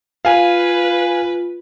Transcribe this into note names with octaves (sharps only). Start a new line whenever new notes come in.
F4 B4 F5 G#5